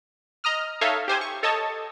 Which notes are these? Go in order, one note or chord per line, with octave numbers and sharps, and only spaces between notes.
D#5 A#5 D#6 F6
D#4 A4 C#5 E5 F5
G4 C5 G#5
C#6
A4 C#5 D#5 A5